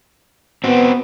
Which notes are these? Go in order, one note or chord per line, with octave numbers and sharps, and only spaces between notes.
B3 C4 F#4